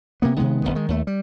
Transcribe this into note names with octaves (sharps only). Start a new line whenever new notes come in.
C3 A#3 B3
C3 D#3 G#3 B3
E1 A#1 D#3 B3
D#3 G#3
D#2 A3
G3